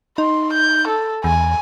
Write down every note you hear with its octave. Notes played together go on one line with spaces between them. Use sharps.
D#4 C6
G6
A4
E2 G#5